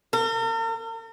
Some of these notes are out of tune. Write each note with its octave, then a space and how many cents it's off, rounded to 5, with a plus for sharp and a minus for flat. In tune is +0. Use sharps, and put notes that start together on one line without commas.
A#4 -45